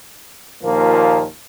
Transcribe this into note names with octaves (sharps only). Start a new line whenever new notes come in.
D#2 A#2 F3 A#3